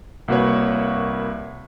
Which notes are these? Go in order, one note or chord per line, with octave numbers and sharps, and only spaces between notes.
C2 A#3 F#4 B4 C#5